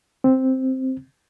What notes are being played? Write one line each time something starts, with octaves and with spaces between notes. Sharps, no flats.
C4